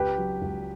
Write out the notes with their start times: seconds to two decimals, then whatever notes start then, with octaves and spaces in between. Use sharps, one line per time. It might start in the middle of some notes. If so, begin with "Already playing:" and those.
Already playing: C#2 G4 B4
0.18 F#3
0.42 C#2